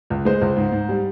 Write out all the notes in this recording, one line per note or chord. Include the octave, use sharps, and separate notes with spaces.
C#2
G#3 C5
C#2
G#2
G#2
G3